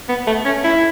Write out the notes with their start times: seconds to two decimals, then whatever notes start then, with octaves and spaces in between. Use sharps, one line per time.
0.09 B3
0.27 A3
0.45 C#4
0.64 E4